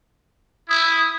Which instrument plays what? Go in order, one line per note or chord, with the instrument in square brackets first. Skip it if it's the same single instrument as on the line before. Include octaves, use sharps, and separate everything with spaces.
[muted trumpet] E4 [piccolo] D#6